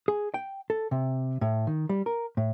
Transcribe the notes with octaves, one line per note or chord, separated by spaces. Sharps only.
G#4
G5
A4
C3
A2
D#3
G3
A#4
A2